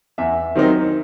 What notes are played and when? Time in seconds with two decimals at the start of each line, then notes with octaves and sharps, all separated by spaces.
0.18 E2 E5
0.55 D#3 F#3 C4 D#4